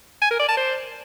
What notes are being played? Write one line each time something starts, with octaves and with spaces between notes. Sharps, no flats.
G#5
A#4
D5
A5
C5